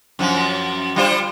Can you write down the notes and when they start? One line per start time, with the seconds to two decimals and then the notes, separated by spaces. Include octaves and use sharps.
0.19 F#2 F3
0.96 G3 F4 C5